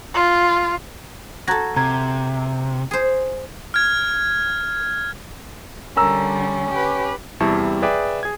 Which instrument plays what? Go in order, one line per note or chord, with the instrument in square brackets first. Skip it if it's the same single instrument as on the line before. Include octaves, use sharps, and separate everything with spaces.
[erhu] F4
[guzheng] F#4 A4 [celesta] A#5 G#6 A#6
[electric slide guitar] C3 [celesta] A#5 G#6
[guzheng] G#4 C5
[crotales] F6 G#6
[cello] D3 G3 [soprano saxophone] C#4 [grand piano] A#4 A#5 E6
[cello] G4 B4
[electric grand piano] E2 C3 G3 E4 A5 C#6
G#4 B4 D5 E5 G5 D6
G#4 G#6